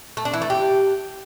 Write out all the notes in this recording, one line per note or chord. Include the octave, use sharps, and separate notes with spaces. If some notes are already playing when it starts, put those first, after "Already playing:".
A3
D4
E3
A3
G4